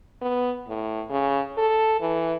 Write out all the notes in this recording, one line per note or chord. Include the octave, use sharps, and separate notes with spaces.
B3
A2
C#3
A4
E3